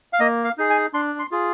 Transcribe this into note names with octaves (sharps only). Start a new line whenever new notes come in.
F5
A#3 D#5
F5
D#4 G#4
G#5
D4 C6
C6
F4 G#4